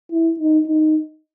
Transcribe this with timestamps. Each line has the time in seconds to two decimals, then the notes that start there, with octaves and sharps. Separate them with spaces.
0.12 E4
0.39 D#4
0.67 D#4